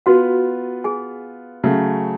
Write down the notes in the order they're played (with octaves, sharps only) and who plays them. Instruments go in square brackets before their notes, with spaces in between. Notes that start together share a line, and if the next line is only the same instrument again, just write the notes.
[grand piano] B3 F4 B4 [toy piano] F#4 F#5
[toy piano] G#4 G#5
[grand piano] C#3 F#3 A3